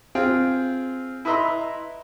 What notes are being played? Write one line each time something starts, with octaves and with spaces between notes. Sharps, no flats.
C4 F4 G#4 G5
E4 B4 D#5 E5 A#5 C6